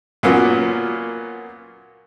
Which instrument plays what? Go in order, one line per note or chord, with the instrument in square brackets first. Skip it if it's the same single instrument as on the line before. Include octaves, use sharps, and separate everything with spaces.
[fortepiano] A#2 F#3 A#3 B3 C#4 F4